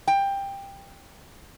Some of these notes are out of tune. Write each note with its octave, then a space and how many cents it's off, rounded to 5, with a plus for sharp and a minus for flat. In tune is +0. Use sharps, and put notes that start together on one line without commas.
G5 +15